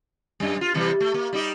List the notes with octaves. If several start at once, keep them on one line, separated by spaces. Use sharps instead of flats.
F#2 G3
F4
C3 E3 G3
A3
A#3
G3 D#4 G4